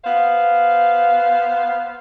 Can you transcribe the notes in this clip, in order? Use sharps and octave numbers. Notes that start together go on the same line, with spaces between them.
B3 C5 F5